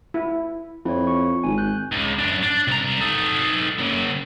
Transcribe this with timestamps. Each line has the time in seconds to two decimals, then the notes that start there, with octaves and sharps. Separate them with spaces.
0.14 E4
0.85 F2 E4 C#5
1.07 C#6
1.44 G#1 G#5
1.58 F#6 G6
1.92 C#2
2.19 F#2 D4
2.43 D4
2.68 C2 A#5
3.00 D#4 A4
3.79 C#3 A#3